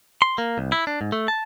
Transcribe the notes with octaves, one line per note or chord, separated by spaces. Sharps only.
C6
A#3
C2
E4
D4
G#2
A3
A5